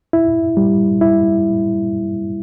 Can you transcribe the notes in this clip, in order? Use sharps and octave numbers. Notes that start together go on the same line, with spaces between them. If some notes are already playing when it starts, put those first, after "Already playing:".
E4
G3
E4